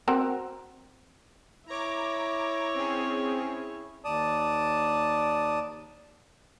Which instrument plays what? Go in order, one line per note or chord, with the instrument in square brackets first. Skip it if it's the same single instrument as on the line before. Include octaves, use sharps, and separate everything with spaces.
[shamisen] C4 F#4 A#4
[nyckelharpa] E4 C#5 [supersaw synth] A#5 D6
[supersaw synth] C4 C#4 G#4
[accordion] D#2 D5 A5 D#6